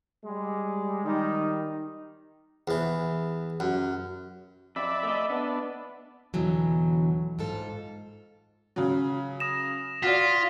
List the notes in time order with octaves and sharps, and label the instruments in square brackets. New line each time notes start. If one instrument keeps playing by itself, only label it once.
[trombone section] G3 G#3
D#3 G3 D#4
[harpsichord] E2 E3
F#2
[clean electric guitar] F2 [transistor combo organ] D5 E5 B5
[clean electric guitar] A3 D#5
[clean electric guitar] B3 [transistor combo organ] D4
[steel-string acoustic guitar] E2 B2 D3 E3 F#3
G#2 F4 A4
[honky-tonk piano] C#3 F#3
[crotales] D#6 A#6 E7
[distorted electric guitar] F4 [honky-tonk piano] F#4 D5 [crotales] B6